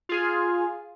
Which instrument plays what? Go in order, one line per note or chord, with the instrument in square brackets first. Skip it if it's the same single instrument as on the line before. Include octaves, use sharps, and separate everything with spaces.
[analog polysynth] F4 G#4